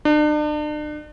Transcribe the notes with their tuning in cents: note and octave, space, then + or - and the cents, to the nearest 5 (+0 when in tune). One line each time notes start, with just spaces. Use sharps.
D4 +40